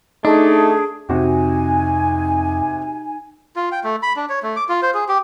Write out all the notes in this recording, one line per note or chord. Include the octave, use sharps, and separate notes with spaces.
A3 D4 D#4 G#4
F2 C3 D#4 F#4 G4 G#5
F4
G5
A3
B5
D4
C#5
A3
D6
F4
C5
G#4
G4